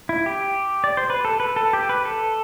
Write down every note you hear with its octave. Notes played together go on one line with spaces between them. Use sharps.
E4
G4
D5
C5
B4
A4
B4
A4
G4
B4
A4